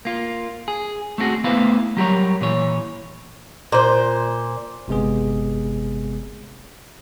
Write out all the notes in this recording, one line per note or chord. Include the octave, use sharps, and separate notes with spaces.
A#3 F4
G#4
A3 C4 D#4 F#4 G#4
A3 B3 E4 B4 C5 F5
F#3 G3 G4 A4 A#4 C#5
A#2 E3 C#5
A#2 C5
G1 C3 G#3 B3 G#4